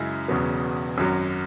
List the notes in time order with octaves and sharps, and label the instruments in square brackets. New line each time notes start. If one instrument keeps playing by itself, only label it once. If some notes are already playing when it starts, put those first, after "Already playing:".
Already playing: [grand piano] F#2 C#3 G#3 E4
E1 E2 C#3 F#3 B3
G#1 F#2 F#3